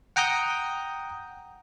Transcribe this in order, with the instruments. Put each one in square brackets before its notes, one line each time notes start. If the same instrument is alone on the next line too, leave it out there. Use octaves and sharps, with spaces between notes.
[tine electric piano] F#5 G5 A#5 D#6 G6